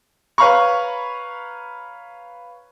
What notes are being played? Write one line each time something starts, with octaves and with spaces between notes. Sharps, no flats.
B4 C#5 F5 A#5 B5 C#6